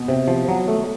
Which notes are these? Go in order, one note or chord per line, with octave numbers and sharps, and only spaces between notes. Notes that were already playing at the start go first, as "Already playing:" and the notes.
Already playing: B2
C3
F3
F#3
A3